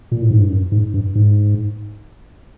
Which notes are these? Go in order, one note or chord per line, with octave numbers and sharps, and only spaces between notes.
A#2
A2
G#2
G2
F#2
G#2
G2
G#2